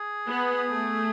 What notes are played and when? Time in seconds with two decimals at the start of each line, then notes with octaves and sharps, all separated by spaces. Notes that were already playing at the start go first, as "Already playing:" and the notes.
Already playing: G#4
0.28 B3
0.69 A3